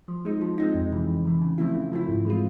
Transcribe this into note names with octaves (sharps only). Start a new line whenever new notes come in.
F3
G#3 C4 D#4
F3
G#3 C4 D#4
F2
C3 E3
F2
C3 E3
C#3
F3 A3 C4 E4
C#3
F3 A3 C4 E4
G#2
E3 G#3 C4 F4